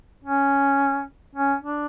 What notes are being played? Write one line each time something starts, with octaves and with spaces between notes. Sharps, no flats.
C#4
C#4
D4